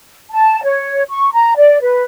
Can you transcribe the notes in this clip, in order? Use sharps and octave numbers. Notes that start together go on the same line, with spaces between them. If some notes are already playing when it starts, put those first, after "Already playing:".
A5
C#5
C#6
A#5
D5
B4